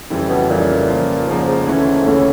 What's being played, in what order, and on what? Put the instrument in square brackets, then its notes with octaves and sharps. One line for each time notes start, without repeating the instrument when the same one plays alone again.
[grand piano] F2 C#3 E3 G3
[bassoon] B2
[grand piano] F2 C#3 E3 G3 [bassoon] A#2
[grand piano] C#3 F3 A#3
[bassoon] G#2 [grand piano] C#3 F3 A#3
[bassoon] G#2
[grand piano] D2 C#3 E3 A3 C#4 [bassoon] A2
[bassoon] G#2
[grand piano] D2 C#3 E3 A3 C#4 [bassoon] A2